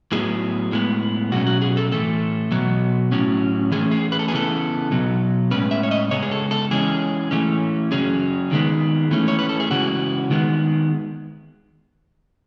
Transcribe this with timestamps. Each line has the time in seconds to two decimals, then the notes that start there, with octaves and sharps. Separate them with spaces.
0.12 A2 F#3 B3 G#4
0.72 A2 G#3 B3
1.32 B2 F#3 C#4 F#4
1.47 F#4
1.62 G#4
1.77 A4
1.92 A2 E3 A3 A4
2.51 B2 F#3 B3
3.12 A2 F#3 C#4
3.72 E3 A3 C#4 G#4
3.91 G#4
4.12 B4
4.19 A4
4.28 G#4
4.32 C#3 E3 B3 A4
4.91 B2 F#3 B3
5.51 A2 G#3 C#4 B4
5.71 E5
5.83 C#5
5.91 D#5
6.11 C#3 G#3 B3 C#5
6.22 G#4
6.31 A4
6.51 A4
6.71 E3 G#3 C#4 G#4
7.31 E3 A3 C#4
7.91 C#3 F#3 C#4 G#4
8.51 D#3 G#3 B3
9.11 E3 A3 C#4
9.28 C#5
9.39 B4
9.49 A4
9.60 G#4
9.71 C#3 E3 G#3 F#4
10.31 D#3 G#3 B3